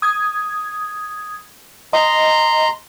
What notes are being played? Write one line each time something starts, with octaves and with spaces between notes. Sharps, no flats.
D#6 G#6
D#5 A#5 C6